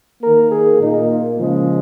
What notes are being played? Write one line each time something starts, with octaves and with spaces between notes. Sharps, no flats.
D#3 A#3 A#4
G#4
A#2 A#3 D#4
F4
C#3 F3 G#3 G#4